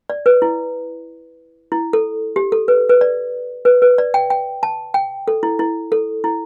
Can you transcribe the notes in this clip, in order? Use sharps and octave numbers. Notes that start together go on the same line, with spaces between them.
D5
B4
E4
E4
A4
G4
A4
B4
B4
D5
B4
B4
D5
G5
G5
A5
G5
A4
E4
E4
A4
E4